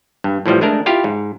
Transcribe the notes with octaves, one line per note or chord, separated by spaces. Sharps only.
G2
A2 E3 F3 G3
G#3 A3 D4 A#4
E4 F4 G4 F5
G#2